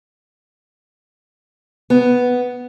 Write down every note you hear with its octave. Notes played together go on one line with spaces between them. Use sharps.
B3